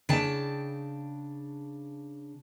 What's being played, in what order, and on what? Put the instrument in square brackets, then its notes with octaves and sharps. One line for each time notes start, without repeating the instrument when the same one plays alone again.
[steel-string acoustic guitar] C#3 D4 G5 A5